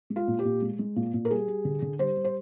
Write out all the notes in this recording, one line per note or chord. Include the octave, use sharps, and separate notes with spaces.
G#3
F4
A#2
G4
A#2
G#3
G#3
A#2
A#2
A#4
G3 G#4
G3
D3
D3
G3 C5
G3
C5